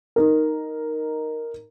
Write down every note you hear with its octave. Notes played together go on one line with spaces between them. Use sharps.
D#4 A#4